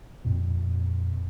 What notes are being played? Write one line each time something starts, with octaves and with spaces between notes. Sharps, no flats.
F2 A#2